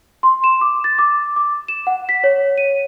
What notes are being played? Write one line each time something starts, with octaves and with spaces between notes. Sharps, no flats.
C6
E7
D6
A6
D6
D6
E7
F#5
B6
C#5
D#7